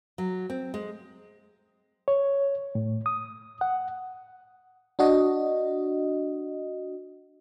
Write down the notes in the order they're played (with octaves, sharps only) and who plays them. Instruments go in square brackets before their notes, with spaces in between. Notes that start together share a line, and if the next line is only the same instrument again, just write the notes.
[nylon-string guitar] F#3
C4
G#3
[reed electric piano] C#5
A2
D#6
F#5
[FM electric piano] D4 F#4 D#5